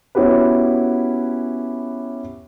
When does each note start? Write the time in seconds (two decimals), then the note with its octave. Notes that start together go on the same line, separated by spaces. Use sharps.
0.15 B3 C#4 E4 F#4 G4 B4